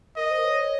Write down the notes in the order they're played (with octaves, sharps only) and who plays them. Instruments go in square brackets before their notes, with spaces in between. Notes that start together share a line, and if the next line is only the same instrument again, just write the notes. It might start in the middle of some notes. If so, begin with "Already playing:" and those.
[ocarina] A#4 [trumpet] D#5
[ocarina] C5
C#5